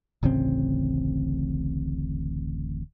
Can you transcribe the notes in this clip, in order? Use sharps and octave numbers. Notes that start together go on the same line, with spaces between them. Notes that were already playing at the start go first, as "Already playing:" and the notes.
D1 A1 C#3 C4